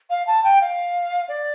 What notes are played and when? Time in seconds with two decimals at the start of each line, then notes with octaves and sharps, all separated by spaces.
0.10 F5
0.27 A5
0.44 G5
0.61 F5
1.28 D5